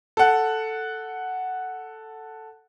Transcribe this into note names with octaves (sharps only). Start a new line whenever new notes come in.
A4 F#5